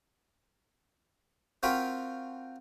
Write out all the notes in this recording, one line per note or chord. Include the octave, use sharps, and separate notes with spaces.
C4 F4 F#4 A#4 G5 B5